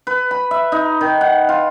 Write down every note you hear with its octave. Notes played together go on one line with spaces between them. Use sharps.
B4
B5
E5
D#4
D#3
F#5
F4